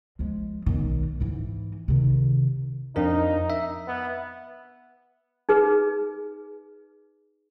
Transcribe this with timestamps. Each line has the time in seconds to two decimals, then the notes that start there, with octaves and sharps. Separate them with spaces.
0.19 F3 G#3
0.66 B1 D#3
1.20 G#2 E3
1.88 C3 D#3
2.96 F2 D4 D#4 A#4
3.50 E5
3.87 B3
5.49 D#4 G#4 B4